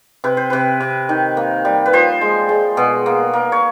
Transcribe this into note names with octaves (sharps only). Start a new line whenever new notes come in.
C3 B4
C5
C3 B4
C3
D#3
A#3
G3
B4
F3 C5
G#3
G#3
B2
A#3
A#3
C#5